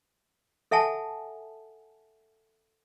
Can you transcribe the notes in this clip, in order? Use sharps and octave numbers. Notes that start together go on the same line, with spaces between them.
A4 E5 F#5 G#5 A5